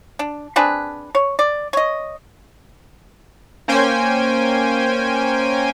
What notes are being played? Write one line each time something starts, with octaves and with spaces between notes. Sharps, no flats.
D4
C4 D4 G#4 B4
C#5
D5
C#5 D#5
A#3 C#4 C5 G5 G#5